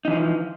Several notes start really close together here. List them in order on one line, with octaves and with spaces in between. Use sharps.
D#4 E3 F3